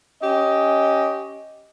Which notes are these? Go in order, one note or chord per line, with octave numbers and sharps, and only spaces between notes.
C#4 G4 D#5